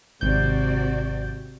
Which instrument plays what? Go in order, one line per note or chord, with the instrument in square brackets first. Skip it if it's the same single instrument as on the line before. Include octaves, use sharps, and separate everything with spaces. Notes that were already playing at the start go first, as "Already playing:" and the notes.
[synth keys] G#1 G6 [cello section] C3 F#4 D5